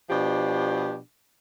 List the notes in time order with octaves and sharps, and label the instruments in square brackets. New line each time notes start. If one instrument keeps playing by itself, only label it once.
[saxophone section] B2 F3 D4 G4